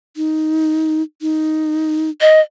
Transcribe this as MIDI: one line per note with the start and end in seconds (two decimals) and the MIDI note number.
0.17 1.02 63
1.22 2.10 63
2.21 2.41 75